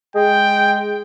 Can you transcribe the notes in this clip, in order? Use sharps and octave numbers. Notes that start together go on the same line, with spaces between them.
G#3 G5